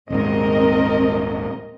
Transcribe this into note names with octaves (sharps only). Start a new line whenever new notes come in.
D#1 G#2 C4 A#4 D#5